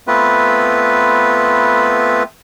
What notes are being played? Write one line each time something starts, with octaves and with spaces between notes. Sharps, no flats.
A3 B3 C4 F4 B4